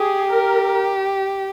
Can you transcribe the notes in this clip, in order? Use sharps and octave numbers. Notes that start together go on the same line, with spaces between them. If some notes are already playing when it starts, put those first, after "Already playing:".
Already playing: G4 G#4
A#4